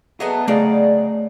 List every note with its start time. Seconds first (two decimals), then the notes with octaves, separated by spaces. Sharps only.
0.20 F#3 A3 B3 G#4 D#5
0.48 C#3 F#3 A3 G#4 D5 D#5